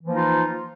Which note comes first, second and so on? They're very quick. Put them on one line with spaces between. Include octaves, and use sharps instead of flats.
E3 F3 A#3 D#4 F4